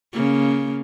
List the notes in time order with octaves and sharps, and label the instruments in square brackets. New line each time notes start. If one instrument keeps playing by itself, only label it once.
[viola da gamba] C#3 A#3